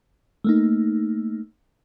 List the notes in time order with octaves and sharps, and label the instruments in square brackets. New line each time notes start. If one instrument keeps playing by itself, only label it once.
[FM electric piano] A3 A#3 D#4